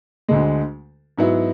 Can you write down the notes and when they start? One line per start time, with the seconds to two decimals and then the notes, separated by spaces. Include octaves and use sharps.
0.28 D2 D3 G#3
1.18 G#2 F#3 B3 E4